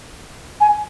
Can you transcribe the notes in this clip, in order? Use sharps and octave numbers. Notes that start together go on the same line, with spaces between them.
G#5